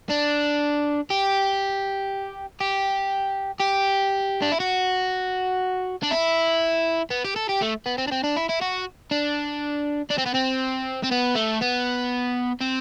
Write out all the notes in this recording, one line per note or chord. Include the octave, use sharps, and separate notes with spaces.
D4
G4
G4
G4
D4
E4
F#4
D4
E4
B3
G4
A4
G4
A3
B3
C4
D4
C4
D4
E4
E4
F#4
D4
D4
C4
B3
C4
C4
B3
A3
B3
C4